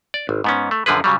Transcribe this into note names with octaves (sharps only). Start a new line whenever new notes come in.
D5
G#1
G#2 B3 C#4
A3
F#2 D3 F3 G#4 B4
C#3 F#3 G3